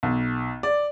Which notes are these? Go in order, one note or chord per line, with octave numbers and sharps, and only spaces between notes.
B1
D5